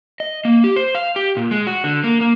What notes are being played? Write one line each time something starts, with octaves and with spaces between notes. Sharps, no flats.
D#5
A#3
G4
C5
F5
G4
A#2
G#3
F#4
D3
A#3
A#3